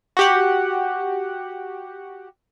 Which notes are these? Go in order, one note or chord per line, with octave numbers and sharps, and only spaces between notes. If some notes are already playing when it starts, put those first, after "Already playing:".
F#4 G4 F#5